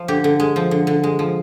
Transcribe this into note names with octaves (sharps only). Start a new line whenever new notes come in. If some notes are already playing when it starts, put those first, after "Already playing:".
Already playing: F3
D3 G4
D3
G#3
F3
D3
D3
G#3
F3